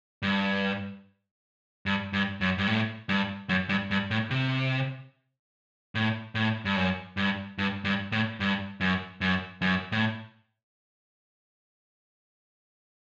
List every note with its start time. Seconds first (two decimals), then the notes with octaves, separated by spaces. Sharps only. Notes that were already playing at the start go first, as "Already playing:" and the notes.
0.22 G2
1.86 G2
2.13 G2
2.41 F#2
2.58 G2
2.67 A2
3.09 G2
3.49 F#2
3.69 G2
3.91 G2
4.11 A2
4.30 C3
5.95 A2
6.35 A2
6.65 G2
6.76 F#2
7.17 G2
7.58 G2
7.85 G2
8.12 A2
8.40 G2
8.81 F#2
9.21 F#2
9.62 F#2
9.92 A2